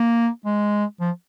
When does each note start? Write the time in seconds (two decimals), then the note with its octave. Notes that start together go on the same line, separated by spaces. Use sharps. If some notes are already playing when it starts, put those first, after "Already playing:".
Already playing: A#3
0.45 G#3
1.00 F3